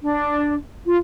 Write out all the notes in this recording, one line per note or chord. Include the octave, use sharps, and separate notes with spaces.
D4
F4